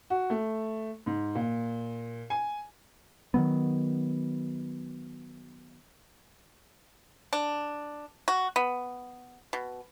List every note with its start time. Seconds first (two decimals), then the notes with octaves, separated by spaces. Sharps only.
0.10 F#4
0.30 A3
1.06 G#2
1.35 A#2
2.30 G#5
3.34 D#3 F3 F#3 B3
7.33 D4
8.28 F#4
8.56 B3
9.53 B2